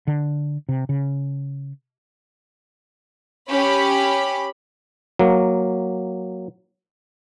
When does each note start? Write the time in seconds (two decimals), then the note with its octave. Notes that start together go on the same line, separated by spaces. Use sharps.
0.07 D3
0.69 C3
0.89 C#3
3.49 C#4 G4 B5
5.19 F#3 A#3